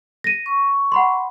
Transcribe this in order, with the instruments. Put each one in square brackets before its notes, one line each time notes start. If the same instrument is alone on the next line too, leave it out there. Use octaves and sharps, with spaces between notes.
[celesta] A#6 D#7
[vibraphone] C#6
[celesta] F#5 B5 C6